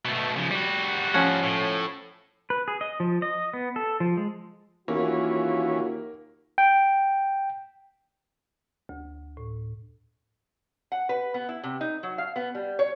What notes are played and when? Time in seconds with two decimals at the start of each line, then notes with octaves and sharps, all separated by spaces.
0.05 B2 A3
0.37 C#3 F3
0.51 G3 F#4
1.14 F3 C#4 F#5
1.43 A2
2.50 B4
2.68 G#4
2.81 D#5
3.00 F3
3.22 D#5
3.53 B3
3.76 A4
4.00 F3
4.17 G#3
4.88 D#2 E3 A#3 C#4 F4 F#4
6.58 G5
8.89 D2
9.37 A2
10.92 F#5
11.09 B4
11.34 B3
11.49 E4
11.63 C3
11.81 D#4
12.03 F#3
12.18 F5
12.36 B3
12.55 G3
12.79 C#5